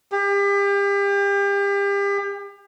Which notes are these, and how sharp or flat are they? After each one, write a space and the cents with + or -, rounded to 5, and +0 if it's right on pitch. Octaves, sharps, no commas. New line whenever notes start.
G4 +35